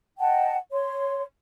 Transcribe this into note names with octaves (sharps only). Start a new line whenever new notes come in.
D#5 F#5 G5 A5
C#5 C6